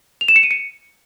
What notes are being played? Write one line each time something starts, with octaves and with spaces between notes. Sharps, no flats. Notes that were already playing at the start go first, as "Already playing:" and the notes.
F7
E7
C#7
D#7
C#7